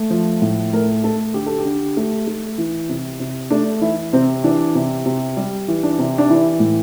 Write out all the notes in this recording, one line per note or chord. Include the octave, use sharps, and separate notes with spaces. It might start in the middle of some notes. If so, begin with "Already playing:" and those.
Already playing: A3
F3
A2
A3 A#4
A3 A4
D3 G4
A4
G4
D3
A3
A3
E3
C3
C3
A3 D4
E3 E4
C3 C4
E3 D4
C3
C3
G3
E3
D4
C3
D4
E3 E4
A2